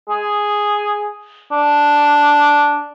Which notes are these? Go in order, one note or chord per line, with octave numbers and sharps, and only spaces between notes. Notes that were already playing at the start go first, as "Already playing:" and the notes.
G#4
D4